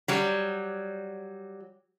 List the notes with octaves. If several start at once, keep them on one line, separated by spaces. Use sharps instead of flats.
F#3 G3